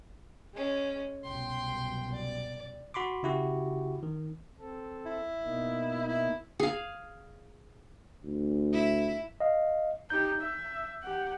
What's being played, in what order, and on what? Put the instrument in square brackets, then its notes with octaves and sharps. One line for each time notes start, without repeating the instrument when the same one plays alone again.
[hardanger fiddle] G#3 C#4
[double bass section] C2 F#2 B2 [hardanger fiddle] G5 C6
[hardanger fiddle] D5
[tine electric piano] F#4 B5 C6 D6
C#3 E4 F#4 G4
D#3
[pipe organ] C4 A4
[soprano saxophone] E4
[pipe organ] B2 A#3 D#4
[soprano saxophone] E4
[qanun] G#4 F5
[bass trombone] D2
[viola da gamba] E4
[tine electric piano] D#5 F5
[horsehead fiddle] D#4 G4 [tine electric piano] G6
[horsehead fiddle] E5
G4 F#5